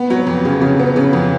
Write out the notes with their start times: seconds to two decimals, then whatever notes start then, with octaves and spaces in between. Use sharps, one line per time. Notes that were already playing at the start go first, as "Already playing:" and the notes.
Already playing: B3
0.10 F#3
0.27 F2
0.45 C#3
0.62 C#3
0.79 B3
0.96 C#3
1.13 F2